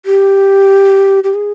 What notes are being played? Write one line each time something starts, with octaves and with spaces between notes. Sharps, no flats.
G4
G4
G#4